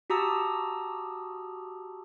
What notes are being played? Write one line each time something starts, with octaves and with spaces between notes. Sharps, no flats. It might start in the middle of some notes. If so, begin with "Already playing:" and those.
F#4 G4 A5 A#5 D#6 E6